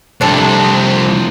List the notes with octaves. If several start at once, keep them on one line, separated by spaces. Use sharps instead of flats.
C2 F2 C3 C4 D4 A4